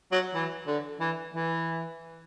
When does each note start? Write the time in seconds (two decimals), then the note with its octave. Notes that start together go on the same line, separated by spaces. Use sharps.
0.12 F#3
0.34 E3
0.67 D3
1.00 E3
1.34 E3